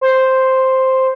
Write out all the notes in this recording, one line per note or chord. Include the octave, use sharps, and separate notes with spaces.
C5